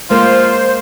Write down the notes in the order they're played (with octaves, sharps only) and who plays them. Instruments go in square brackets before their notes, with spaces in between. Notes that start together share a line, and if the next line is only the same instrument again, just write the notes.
[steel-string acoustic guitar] G#3 A#3 [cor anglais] F4 [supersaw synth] C5